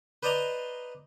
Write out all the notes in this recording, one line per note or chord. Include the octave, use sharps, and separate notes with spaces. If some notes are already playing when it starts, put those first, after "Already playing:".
B4 C5 D5 D#5 A#5 C6